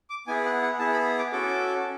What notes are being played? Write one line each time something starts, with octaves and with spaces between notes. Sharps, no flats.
D6
B3 E4 G#4 G#5
F#5
F#5
B3 E4 G#4 A5
B5
D6
C#4 F#4 A4 D6